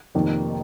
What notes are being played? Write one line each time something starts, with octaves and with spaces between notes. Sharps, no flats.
F1 F2 D#3 A#3 D#4